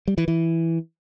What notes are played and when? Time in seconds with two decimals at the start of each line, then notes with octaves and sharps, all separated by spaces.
0.08 G3
0.18 E3
0.28 E3